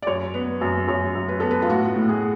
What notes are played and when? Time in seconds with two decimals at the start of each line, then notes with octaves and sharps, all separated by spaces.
0.02 D5
0.07 F#2 C#5
0.34 B3
0.61 F#2
0.87 F#2 C#5
1.15 F#2
1.28 B4
1.40 B3 A4
1.51 B4
1.62 F4
1.69 A2 F#4
1.95 A2
2.09 G#4